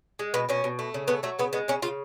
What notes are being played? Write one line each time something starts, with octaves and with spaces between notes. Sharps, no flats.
G#3
B2 B3
B2 C#4
B2
A3
C#3
A3 B3
F#3 A3
C#3 B3
G#3 B3
C#3 C#4
C#3 F4